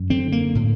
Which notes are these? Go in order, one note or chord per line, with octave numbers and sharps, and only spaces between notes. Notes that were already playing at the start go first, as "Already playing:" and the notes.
Already playing: F#2
D3 C4
A#3
A2